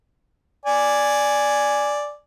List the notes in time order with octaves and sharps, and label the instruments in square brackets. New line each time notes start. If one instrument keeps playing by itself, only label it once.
[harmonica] D5 G#5